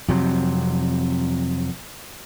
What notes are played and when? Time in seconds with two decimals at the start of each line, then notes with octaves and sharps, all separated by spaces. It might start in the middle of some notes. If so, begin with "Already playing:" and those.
0.08 F2 C3 F#3